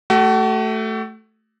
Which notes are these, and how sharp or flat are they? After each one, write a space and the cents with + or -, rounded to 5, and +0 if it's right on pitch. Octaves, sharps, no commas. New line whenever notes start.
A3 +0 F#4 +40